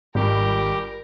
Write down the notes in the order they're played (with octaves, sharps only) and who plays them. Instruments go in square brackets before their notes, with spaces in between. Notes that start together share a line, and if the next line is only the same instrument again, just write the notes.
[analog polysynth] G#1 [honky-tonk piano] C#2 G2 [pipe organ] G4 [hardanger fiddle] A#4